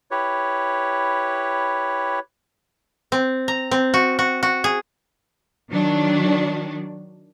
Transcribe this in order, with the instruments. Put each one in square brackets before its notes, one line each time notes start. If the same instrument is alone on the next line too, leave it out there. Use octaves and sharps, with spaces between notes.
[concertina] E4 G4 B4 C#5
[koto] C4
A#5
C4
F#4
F#4
F#4
G#4
[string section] D#3 F#3 D4